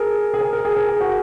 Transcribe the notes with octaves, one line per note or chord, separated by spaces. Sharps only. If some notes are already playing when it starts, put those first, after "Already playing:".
Already playing: G#4 A#4
G#4
A#4
A#4
G#4
A#4
G#4
F#4